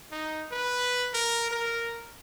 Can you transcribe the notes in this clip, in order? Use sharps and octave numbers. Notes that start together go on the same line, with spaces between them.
D#4
B4
A#4
A#4